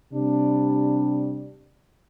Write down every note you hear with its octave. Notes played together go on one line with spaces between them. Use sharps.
C3 G3 D4